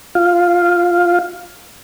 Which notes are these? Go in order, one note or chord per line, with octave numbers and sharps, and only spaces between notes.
F4 F5